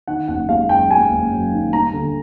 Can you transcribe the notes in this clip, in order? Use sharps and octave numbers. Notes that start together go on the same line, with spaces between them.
D#3 F#5
F#1 F#5
G#3 F5
F#2 G5
G#3 G#5
F#1
F#2
D#3
G3 A#5
D3